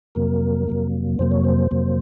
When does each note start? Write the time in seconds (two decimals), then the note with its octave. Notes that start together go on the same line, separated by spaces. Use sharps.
0.15 F2 C3 F#3 A#3 A#4
0.68 F2 C3 F#3 A#3
1.19 F2 C3 F#3 A#3 C5
1.31 C#5
1.44 C5
1.71 F2 C3 F#3 A#3